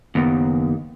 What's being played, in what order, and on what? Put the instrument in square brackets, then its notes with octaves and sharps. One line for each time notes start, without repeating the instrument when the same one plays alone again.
[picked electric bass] F#1 B3 [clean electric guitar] D#2